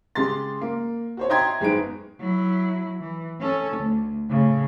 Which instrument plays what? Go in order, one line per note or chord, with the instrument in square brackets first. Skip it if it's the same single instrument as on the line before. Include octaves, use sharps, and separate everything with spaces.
[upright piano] C#3 G#3 G4 C6 A6
A#3
F#4 C5 C#5
D#5 E5 G5 A#5 C6 G#6
F#1 G#3 B3 D#4 D7
[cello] F#3 E4
E3
C#4 A4
D2
A2 C#3